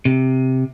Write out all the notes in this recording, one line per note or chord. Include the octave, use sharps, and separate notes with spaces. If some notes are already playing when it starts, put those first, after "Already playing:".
C3